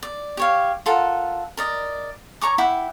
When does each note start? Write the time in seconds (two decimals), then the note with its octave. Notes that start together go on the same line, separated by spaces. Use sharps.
0.03 D5
0.37 G4 C#5 F5
0.86 F4 A4 A#4 F#5
1.57 A#4 D5 D#5
2.41 C#5 A#5 C#6 D6
2.58 E4 F#5 G5 D6